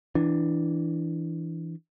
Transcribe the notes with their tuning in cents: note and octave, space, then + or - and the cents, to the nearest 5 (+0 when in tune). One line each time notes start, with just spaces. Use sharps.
E3 +0 D4 +0